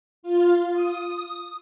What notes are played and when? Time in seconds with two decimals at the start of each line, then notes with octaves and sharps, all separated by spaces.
0.23 F4
0.73 D#6